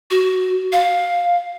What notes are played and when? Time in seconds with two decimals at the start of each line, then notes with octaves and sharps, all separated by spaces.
0.11 F#4
0.73 F5